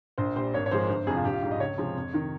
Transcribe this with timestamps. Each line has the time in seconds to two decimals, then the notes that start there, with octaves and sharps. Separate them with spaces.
0.18 A#1 C5
0.35 A#2 G3 C5
0.54 G#1 C#5
0.66 C#5
0.71 G#2 F3 G#3 C5
0.89 G1 C5
1.07 F2 C3 F3 G#4
1.16 F4
1.25 A#1 G4
1.33 F4
1.43 G#2 G3
1.51 D#5
1.60 C#2 C#5
1.78 C3 F3 G#3
1.96 F2
2.13 C3 D#3